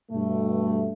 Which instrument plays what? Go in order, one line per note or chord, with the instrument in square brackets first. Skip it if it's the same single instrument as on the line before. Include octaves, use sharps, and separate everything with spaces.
[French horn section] G2 B2 A3